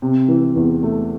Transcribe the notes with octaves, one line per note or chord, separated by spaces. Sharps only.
C3
E3
E2
A3